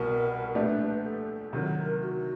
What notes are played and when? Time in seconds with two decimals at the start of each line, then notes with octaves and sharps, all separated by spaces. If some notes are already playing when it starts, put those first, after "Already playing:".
Already playing: C2 B2 A#4
0.55 A#2 F3 A3 D4 G4 B4
1.04 A4
1.53 C3 D#3 F#3 A#4
2.01 F#4